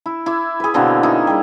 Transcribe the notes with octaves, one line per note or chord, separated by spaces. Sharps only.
E4
E4 D6
G#4 B4
B2 D3 A#3 C4
D#4 E4 A#4
G3 G#4